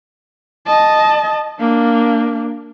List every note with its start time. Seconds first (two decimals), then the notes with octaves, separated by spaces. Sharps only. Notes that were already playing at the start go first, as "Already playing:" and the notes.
0.67 D#5 A5
1.60 A#3 D4